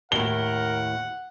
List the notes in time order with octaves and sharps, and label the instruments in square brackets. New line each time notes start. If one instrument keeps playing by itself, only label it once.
[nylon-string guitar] D#2 A2 [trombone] A#4 [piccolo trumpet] F#5 [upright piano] G7